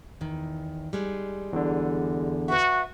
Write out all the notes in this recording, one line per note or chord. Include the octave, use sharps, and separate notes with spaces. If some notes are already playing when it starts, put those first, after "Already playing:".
E2 D#3
G3 G#3 D#4
E2 D3
F#4 B4 E5